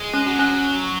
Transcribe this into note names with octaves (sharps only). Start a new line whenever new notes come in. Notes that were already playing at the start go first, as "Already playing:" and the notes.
Already playing: G#3
C#4
F#3
C#4